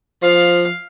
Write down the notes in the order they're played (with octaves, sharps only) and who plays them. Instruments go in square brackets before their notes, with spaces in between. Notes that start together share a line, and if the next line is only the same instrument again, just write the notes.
[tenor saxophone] F3 [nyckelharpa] F5